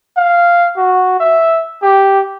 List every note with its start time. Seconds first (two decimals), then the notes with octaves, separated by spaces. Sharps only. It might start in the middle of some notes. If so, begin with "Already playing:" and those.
0.17 F5
0.77 F#4
1.20 E5
1.82 G4